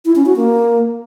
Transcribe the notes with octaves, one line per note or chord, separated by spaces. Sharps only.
E4
C#4
F#4
A#3